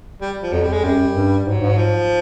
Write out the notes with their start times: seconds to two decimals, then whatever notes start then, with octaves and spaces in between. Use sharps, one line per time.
0.21 G3
0.42 F3
0.53 F2 F#3
0.63 G3
0.68 F2 G#3
0.84 F#2 G3
1.15 G2
1.46 G#2 F#3
1.61 G#2
1.77 F3